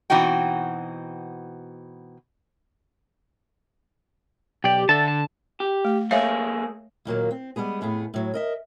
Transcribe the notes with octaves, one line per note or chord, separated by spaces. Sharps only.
B2 E3 C4 D#4 F#4 G5
B1 G4 D5
D3 A4 E5 A5
A5
G4
A3
A3 A#3 G#4 C#5 E5 F5
D#2 A#2 F#3 A#3
C4
G3 G#3 B3 G#4
F2 A2 B3 G#4
A2 F#3
A#4 D#5 E5